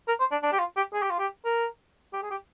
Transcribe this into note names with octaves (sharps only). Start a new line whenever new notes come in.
A#4
C5
D4
D4
G4
F4
G4
G#4
G4
F4
G4
A#4
G4
G#4
G4